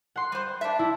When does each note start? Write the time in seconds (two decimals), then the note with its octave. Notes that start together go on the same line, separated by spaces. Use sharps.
0.16 F#5 C6
0.32 G3 C5
0.61 D4 E5
0.79 E4